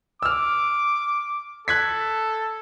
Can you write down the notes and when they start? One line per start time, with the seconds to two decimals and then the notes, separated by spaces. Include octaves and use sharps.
0.22 D6 E6 F6
1.68 A4 F#6 G#6 B6